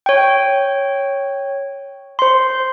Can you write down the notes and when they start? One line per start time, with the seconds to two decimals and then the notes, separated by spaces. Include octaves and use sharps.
0.06 C#5 G5
2.19 C5 C6